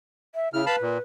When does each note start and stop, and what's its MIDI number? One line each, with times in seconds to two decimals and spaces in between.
0.35 0.48 76
0.53 0.65 49
0.53 0.65 64
0.53 0.65 89
0.66 1.00 71
0.66 0.76 77
0.66 0.76 81
0.66 0.76 83
0.82 0.98 46